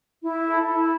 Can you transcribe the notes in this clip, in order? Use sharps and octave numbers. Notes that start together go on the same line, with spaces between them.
E4
A4
E4